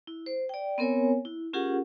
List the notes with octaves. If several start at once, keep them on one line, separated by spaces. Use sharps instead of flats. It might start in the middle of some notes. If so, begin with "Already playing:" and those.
E4
C5
D5 G5
B3 C4 A#4 C#5 G#5
E4
C#4 F4 G4 G#4 A#4 F#5